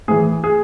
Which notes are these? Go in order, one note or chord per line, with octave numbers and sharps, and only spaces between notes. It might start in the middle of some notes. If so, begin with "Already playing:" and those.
A2 E3 G#4
G#4